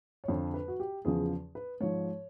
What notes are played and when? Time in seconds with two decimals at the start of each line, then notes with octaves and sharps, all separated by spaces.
0.24 C#5
0.28 F2 D3 F3 C5
0.54 B4
0.68 F#4
0.80 G4
1.05 E2 C#3 F3 G#4
1.55 B4
1.81 G#2 F3 C#5